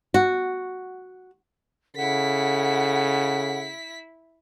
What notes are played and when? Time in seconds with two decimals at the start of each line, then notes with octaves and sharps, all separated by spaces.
0.14 F#4
1.96 C#3 E4 A4 F#5 B6